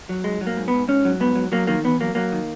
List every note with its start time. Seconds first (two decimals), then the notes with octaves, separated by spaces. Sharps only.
0.09 F#3
0.24 G#2 G#3
0.41 F#3
0.47 A#3
0.57 G#2
0.68 B3
0.73 G#2
0.88 G#2 C#4
1.05 F#3
1.20 G#2 B3
1.36 F#3
1.52 F#3 A#3
1.67 D#3 A#3
1.84 E2 B3
2.00 F#3 A#3
2.15 F#3 A#3
2.32 D#3